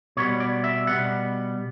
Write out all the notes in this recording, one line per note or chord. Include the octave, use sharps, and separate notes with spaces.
B2 G3 B3 C#5
D5
E5
B2 G3 B3 F#5